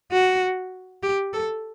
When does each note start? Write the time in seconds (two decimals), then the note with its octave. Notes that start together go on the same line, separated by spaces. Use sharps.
0.12 F#4
1.03 G4
1.33 A4